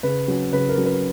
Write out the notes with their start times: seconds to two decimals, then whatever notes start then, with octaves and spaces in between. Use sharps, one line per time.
0.03 C#3 B4
0.28 F#3 C#4
0.53 C#3 B4
0.69 A#4
0.77 F#3 C#4
0.86 B4